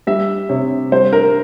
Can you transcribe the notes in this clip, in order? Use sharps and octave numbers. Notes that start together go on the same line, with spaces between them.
G3 E5
C3 C#5
G3 C5
A#4